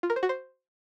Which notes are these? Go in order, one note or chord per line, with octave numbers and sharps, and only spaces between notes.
F4
A#4
C5
F#4
C5